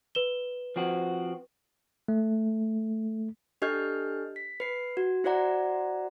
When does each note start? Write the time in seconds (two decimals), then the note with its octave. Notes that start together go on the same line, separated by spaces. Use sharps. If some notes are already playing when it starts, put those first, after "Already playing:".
0.15 B4 E7 G7
0.76 F3 C4 F#4
2.08 A3
3.62 D4 G4 A4 D#5 F6 G6
4.36 B6
4.60 B4 C7
4.97 F#4
5.24 E4 F#4 C5 D5 F#5 A#5